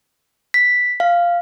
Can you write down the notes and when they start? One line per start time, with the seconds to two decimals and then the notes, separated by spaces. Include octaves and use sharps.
0.54 B6
1.00 F5